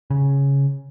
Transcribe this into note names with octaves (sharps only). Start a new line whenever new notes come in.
C#3